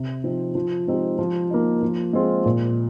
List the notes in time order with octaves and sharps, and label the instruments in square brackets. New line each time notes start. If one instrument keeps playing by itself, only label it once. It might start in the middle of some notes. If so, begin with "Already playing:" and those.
Already playing: [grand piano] C3
F3 C4 D#4
F3
G#3 C4 D#4 G4
F3
A#3 D#4
F3
G#3 C4 F4 G#4
A#2